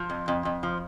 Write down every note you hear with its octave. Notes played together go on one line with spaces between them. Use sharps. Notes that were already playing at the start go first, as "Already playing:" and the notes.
Already playing: F3
F2
F2
F2
F3